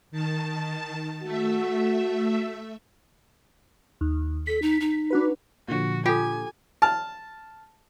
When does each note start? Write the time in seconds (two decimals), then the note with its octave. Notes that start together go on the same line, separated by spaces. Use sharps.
0.11 D#3 A5
1.23 A3 F#4 E5
4.01 D#2
4.47 A4 B6
4.62 D#4
4.80 D#4
5.10 D4 F#4 B4
5.68 A#2 D3 F3 F#4
6.06 F4 G4 A4 G#5
6.82 A5 F6